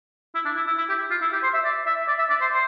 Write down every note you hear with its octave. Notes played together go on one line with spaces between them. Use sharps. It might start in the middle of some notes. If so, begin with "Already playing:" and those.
E4
D4
E4
E4
E4
G4
F4
E4
G4
C5
E5
D5
E5
D5
E5
D5
C5
C5